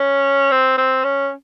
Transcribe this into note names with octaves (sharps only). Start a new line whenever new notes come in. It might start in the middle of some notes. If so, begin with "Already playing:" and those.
Already playing: C#4
C4
C4
C#4